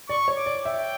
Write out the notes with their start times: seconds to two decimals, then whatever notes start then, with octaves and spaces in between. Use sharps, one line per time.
0.09 D5 C#6
0.28 C#5
0.37 D6
0.46 D5
0.65 E5 G5